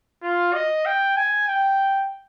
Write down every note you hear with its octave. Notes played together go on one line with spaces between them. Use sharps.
F4
D#5
G5
G#5
G5